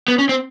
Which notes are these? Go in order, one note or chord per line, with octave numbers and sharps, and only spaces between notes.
B3
C#4
C4